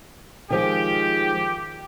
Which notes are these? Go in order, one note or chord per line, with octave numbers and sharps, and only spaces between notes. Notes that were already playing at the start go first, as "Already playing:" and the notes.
D#3 F3 G#3 G4